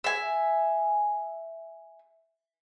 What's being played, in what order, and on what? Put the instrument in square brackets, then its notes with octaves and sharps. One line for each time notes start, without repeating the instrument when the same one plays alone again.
[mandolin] E5 G#5